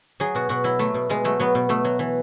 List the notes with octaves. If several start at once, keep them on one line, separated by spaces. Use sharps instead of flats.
F#3 G#4
B2 F#4
B2 F#4
F#3 E4
F#3 A3
B2
B2 G#3
F#3 A3
F#3 B3
B2
B2 A3
F#3
E3